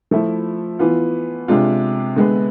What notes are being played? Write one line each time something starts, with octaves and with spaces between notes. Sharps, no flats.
F3 A3 E4
E3 B3 F4
C3 G#3 D4 F4
D3 G#3 B3